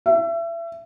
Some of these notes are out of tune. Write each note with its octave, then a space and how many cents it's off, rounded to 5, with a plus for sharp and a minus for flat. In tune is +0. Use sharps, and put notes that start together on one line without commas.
E5 +30